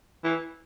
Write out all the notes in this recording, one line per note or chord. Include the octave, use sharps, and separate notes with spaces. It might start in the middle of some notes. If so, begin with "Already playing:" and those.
E3